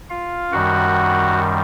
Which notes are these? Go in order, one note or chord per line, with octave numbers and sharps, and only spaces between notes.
F4 F5
F#2 D#3 G3 F#4 F#5